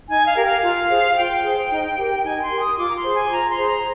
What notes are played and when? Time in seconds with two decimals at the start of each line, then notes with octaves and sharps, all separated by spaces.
0.09 D#4 G#5
0.26 F5
0.36 G4 A#4
0.44 F5
0.62 F4 F5
0.89 G#4 C5
1.16 F4 G5
1.43 G#4 C5
1.70 D#4
1.97 G4 A#4
2.24 D#4 G#5
2.42 C6
2.50 G4 A#4
2.59 D#6
2.77 F4 D6
2.90 A#5
2.94 C6
3.04 G#4 C5
3.12 G#5
3.31 F4 A#5
3.49 C6
3.57 G#4 C5
3.66 A#5